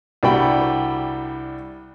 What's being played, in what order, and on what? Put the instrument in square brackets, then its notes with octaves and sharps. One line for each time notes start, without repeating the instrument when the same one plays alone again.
[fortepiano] C2 G3 D4 F#4 G5 B5